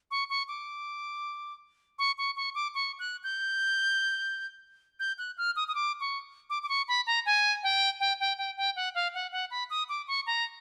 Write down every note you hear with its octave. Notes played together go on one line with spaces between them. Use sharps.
C#6
C#6
D6
C#6
C#6
C#6
D6
C#6
F#6
G6
G6
F#6
F6
D#6
D#6
D6
C#6
D6
D6
C#6
B5
A#5
G#5
G5
G5
G5
G5
G5
F#5
F5
F#5
F#5
B5
D#6
D6
C#6
A#5